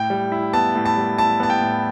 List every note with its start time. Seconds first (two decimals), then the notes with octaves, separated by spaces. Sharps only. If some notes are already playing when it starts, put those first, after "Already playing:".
Already playing: A2 G5
0.10 G3
0.32 E4
0.53 B3 A5
0.75 A2
0.85 A5
0.97 G3
1.18 E4 A5
1.40 B3 A5
1.50 G5
1.60 A2